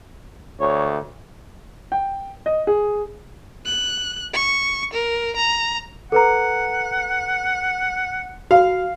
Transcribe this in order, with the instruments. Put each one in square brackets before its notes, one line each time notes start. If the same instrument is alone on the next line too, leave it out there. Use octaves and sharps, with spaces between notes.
[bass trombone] D2 [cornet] C#5
[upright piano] G5
D#5
G#4
[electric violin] F#6
C#6
A#4
A#5
[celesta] A4 B4 A#5 [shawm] F#5
[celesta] F#4 [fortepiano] F5